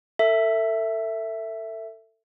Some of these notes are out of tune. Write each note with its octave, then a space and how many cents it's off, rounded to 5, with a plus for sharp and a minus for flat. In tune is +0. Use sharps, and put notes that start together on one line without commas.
A4 +30 E5 +0